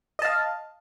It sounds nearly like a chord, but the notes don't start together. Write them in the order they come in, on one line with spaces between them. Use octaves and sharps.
D#5 A5 F5